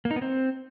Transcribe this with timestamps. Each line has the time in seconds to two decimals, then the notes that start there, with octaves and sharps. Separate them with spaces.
0.05 A#3
0.11 D#4
0.16 B3
0.22 C4